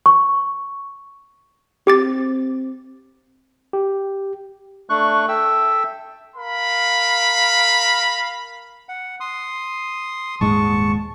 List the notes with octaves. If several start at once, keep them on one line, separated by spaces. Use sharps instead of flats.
C#6
C4 G4 D6 A6
G4
A3 D4 C#6 F#6
A4 E5 G5 E6
A#4 F5 B5
F#5
C6 D#6
D#1 G#2 G#3 A5 C#6